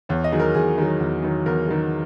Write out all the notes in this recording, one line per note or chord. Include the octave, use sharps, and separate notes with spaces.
E2 C#5
D#5
D#3 F#3 G#4
A#4
E2 G#4
D#3 F#3
E2
D#3 F#3
E2 A#4
D#3 F#3